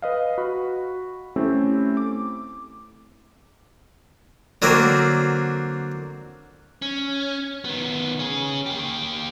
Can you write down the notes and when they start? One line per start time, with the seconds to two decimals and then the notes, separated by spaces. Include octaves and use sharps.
0.02 B4 D#5 F5
0.38 F#4 B5
1.36 A3 C4 C#4 E4 G4
1.97 D6
4.62 D3 F#3 A#3 C4
6.82 C#4
7.65 D#3 B3
8.19 C#4 G#4
8.66 A#3 G4